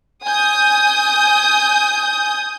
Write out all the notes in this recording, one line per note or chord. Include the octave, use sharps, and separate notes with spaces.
G#5 D#6 G6